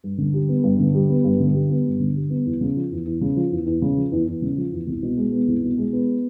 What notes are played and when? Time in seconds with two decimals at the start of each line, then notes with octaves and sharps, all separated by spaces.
0.04 G2
0.18 D3
0.34 G3
0.49 B3
0.64 G2
0.80 D3
0.95 G3
1.09 B3
1.24 G2
1.40 D3
1.54 G3
1.70 B3
1.85 G2
2.00 D3
2.16 G3
2.30 B3
2.46 E2
2.61 C#3
2.76 F3
2.91 E2
3.06 E2
3.21 C#3
3.36 F3
3.51 E2
3.66 E2
3.82 C#3
3.97 F3
4.12 E2
4.27 E2
4.42 C#3
4.57 F3
4.72 E2
4.87 C2
5.03 B2
5.17 G#3
5.32 B3
5.48 C2
5.64 B2
5.78 G#3
5.93 B3